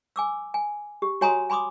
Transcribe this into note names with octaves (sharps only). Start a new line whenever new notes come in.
G#5 D6 E6
G#5
G4
F#4 C#5 G#5 A#5 C6 D#6
G#5 B5 C6 D6 D#6